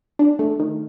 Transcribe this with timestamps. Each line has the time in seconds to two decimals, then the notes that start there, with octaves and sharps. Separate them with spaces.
0.19 D4
0.39 A3
0.59 D#3